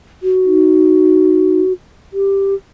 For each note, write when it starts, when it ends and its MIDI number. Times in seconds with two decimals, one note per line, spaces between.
0.23 1.73 66
0.45 1.62 63
2.13 2.54 67